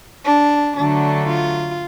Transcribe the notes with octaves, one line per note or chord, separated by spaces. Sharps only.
D4
D3 F#3 A3 D4
F4